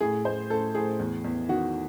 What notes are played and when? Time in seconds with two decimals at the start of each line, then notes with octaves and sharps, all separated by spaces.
0.01 A2 G#4
0.25 A2 C5
0.50 A2 A4
0.75 A2 G#4
1.00 E2
1.24 E2
1.49 D#3 F#4